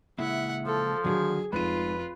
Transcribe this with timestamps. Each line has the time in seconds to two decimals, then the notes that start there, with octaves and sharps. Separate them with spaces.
0.19 C#3 G#3 A#3 E4 E5 F#5
0.66 F3 A4
1.04 D3 D#3 F#3 F#4 G#4
1.53 F1 G#3 D#4 F4 B4 D#7